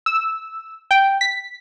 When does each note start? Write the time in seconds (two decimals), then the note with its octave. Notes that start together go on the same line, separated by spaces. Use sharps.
0.06 E6
0.91 G5
1.21 B6